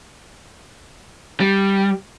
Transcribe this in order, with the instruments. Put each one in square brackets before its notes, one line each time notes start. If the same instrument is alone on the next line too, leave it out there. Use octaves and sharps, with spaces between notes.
[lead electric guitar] G3